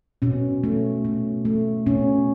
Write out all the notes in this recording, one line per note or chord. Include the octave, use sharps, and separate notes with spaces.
B2 C#4
A3
B2
A3
B2 C#4